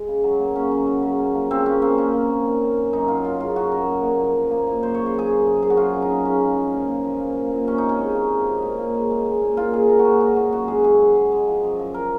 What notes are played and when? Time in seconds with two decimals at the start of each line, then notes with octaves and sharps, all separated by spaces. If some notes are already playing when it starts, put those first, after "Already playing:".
Already playing: G#3
0.08 C#3
0.24 F#3
0.40 A#3
0.55 C#3 C#4
0.71 F#3
0.87 F#3
1.02 C#3
1.18 A#3
1.34 F3
1.51 C#3 C4
1.66 A#3 C#4
1.82 A#3 C4
1.98 A#3 C#4
2.14 A#3
2.30 A#3
2.46 D#3
2.62 D#3
2.77 F#2
2.93 F#2 D#4
3.08 F#3 F4
3.24 F#2 F4
3.40 C#3 F4
3.56 F#3 F#4
3.72 C#3 A#4
3.88 A#3
4.03 A#2
4.20 F3
4.36 F3
4.51 A#3
4.67 A#2
4.83 F#2 C5
4.94 C#3 C#5
5.06 C5
5.14 F#2 G#4
5.30 F#2
5.46 F#2
5.62 F#2 G#4
5.70 F#4
5.77 C#3 F4
5.93 C#3
6.02 D#4
6.09 C#3
6.25 G#3 C#4
6.41 C#3
6.57 F3
6.73 A#2
6.88 A#2
7.04 F3
7.21 A#3
7.36 A#3
7.51 A#2
7.68 C3 C#4
7.78 C3 D#4
7.89 C#4
7.99 G#3
8.15 F3
8.31 G#3
8.47 C3
8.63 A#2
8.78 A#2
8.94 G#3
9.10 G#3
9.26 G#3
9.42 A#2
9.57 A#2 F4
9.73 G#3 G#4
9.89 A#2 A#4
9.99 F#4
10.05 A#2 G#4
10.20 G#3 F#4
10.36 A#2 F#4
10.52 F#2 F#4
10.68 G#3 G#4
10.84 F#2 G#4
11.00 G#3
11.15 G#3
11.32 G#3
11.47 F3
11.63 F#2
11.79 F3
11.94 A#4